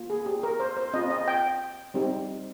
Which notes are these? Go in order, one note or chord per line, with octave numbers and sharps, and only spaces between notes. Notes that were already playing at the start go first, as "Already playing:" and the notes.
Already playing: A#3 F4
G#4
G4
A#4
C5
C5
C4 F4 D#5
D#5
G5
G3 C4 D#4 G4